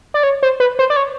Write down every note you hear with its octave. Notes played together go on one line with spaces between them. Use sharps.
D5
C#5
C5
B4
C5
D5
C#5